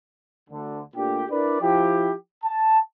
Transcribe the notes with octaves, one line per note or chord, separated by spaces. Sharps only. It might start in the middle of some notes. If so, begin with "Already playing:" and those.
D2 D3
A#2 A3 D4 G4
D4 E4 A#4 B4 D5
F3 E4 G4
A5